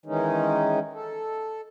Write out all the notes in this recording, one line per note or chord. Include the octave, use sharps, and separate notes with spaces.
D#3 E3 G#3 C#4 D#4
A4